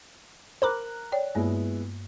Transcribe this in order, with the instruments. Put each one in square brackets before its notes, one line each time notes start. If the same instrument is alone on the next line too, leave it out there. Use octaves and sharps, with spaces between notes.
[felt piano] A#4 A#5 F#6 [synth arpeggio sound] C5 B5 D6
[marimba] C#5 D5 G5
[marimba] G2 A#3 [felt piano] G#3 B3 E4